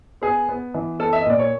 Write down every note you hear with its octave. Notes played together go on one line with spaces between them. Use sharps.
B3 G#4
B3
E3
B3 A4
E5
D#5
A#2 D5
C#5